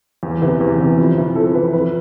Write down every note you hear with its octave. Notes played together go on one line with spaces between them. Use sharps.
E2
C3 E3 B4
E2
C3 E3
F2
E3
F2 A4
C5
E3 B4
F2 B4